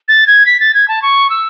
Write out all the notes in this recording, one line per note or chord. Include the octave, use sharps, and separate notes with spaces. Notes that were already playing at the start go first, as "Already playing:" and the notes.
A6
G#6
B6
A6
G#6
A5
C#6
E6